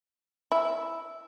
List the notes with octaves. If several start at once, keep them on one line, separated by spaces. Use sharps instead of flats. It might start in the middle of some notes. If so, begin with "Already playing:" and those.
E4